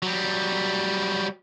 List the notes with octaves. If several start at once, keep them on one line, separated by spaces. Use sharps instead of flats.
F#3 G3